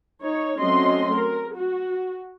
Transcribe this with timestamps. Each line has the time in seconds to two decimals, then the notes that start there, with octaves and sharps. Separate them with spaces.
0.21 D#4 C#5
0.60 F#3 A3 C4 C#4 D#5 C6
1.14 A#4
1.55 F#4